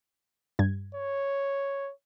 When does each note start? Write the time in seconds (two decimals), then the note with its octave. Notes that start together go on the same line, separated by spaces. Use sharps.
0.59 G2 G#6
0.95 C#5